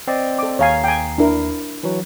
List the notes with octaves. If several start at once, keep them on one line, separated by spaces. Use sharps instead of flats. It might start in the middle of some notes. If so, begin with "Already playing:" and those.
C4 D5 D#5
A4 D6
D#2 C#5 F5 G#5 A#5 C7
G5 G#5
D4 E4 A#4
E3 F#3